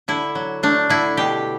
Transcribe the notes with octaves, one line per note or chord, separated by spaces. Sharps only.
D3 E4
F#3
A3 D4
D3 E4
B2 G4